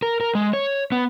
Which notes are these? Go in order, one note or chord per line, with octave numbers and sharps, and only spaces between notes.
A#4
A#4
G#3
C#5
B3